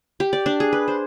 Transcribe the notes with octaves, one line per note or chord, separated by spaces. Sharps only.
G4
D5
D4
G#4
B4
C5